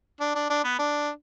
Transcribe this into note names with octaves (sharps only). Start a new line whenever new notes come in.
D4
D4
D4
B3
D4